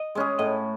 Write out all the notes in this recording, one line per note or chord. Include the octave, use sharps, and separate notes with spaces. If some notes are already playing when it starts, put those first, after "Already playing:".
Already playing: D#5
G#3 C#4 G#4
A2 D#5